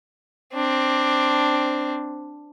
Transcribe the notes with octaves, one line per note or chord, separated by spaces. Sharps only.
C4 D4